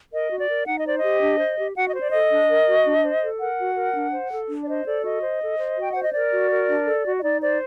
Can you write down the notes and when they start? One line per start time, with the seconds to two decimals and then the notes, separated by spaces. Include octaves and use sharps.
0.12 A#4 D#5
0.30 F#4
0.38 D5
0.48 A#4
0.66 D#4 F#5
0.77 D#5
0.85 C5 D5
0.98 D#5
1.03 G4
1.20 D4
1.39 C5
1.58 G4
1.76 F#4 F#5
1.88 D#5
1.94 C5
1.99 D5
2.10 A4 D#5
2.31 D4
2.49 A#4
2.67 F#4
2.85 D4
3.03 C5
3.22 A4
3.39 A#4 F#5
3.58 F#4
3.76 A#4
3.94 D4
4.12 C5
4.31 A4
4.48 D4
4.63 D5
4.68 C5 D#5
4.85 A4 D5
5.03 F#4 D#5
5.21 C5
5.40 A4
5.58 C5
5.77 F#4 G5
5.92 C5 F#5
6.02 D#5
6.13 A#4 D5
6.31 F#4
6.50 A#4
6.67 D4
6.86 A4
7.05 F#4
7.17 D#5
7.22 D#4 D5
7.41 C5 D5